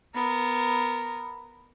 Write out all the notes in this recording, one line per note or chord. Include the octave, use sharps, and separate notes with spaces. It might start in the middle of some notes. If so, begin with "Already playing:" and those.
B3 A#4